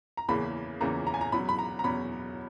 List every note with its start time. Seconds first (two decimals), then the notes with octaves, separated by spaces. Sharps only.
0.17 A#5
0.29 E2 C#3 E3 A#3 C#4 B5
0.80 E2 C#3 E3 A#3 C#4 A#5
1.07 A#5
1.14 G#5
1.21 A#5
1.32 E2 B2 F#3 C#4 B5
1.49 B5
1.59 A#5
1.79 A#5
1.84 E2 B2 F#3 C#4 B5